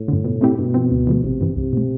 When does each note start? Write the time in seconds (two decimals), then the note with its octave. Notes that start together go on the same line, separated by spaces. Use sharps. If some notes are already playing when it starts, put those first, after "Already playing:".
Already playing: A2
0.08 G2 D3
0.25 B2
0.41 A3 C4 E4 G4
0.58 G2 B2
0.74 F3 C4
0.91 D2
1.07 D3 F3 A3
1.24 A1 C3
1.41 G2 E3
1.56 C2 C3
1.73 B2 A3